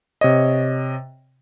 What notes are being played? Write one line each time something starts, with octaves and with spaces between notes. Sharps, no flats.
C3 C#5 D#5